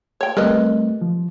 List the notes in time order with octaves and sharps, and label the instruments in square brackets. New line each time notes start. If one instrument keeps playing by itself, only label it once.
[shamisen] C#5 G5
[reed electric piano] G3 A3 C4 [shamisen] A#4 B4 D#5
[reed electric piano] F3